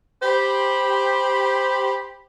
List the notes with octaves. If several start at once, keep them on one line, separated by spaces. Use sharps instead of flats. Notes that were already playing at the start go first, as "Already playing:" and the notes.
G4 C5 B5